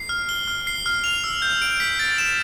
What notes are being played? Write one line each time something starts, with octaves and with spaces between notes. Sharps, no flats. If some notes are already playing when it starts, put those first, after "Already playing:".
Already playing: C7
F6
G7
F6
C7
F6
F7
E6
G6
D7
B6
A6
E7